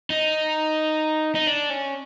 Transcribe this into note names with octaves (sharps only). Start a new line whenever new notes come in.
D#4
D#4
D4
C#4